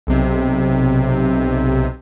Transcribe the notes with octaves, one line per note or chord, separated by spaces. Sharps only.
B1 C3